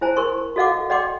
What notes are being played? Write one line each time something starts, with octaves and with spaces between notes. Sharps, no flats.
E4 C5 G#5 A#5
A#4 C6 C#6
F#4 A4 D#5 F5 F#5 D6
D5 D#5 F#5 G5 C6 D6